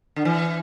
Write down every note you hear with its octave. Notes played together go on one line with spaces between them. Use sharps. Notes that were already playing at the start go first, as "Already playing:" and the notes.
D3
E3